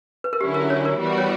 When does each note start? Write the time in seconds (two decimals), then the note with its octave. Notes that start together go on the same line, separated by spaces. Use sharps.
0.24 B4
0.33 A#4
0.41 D3 F#3 C#4 E4 G4
0.54 A#4
0.70 C#5
0.85 A#4
0.99 E3 G3 B3 F#4
1.18 C#5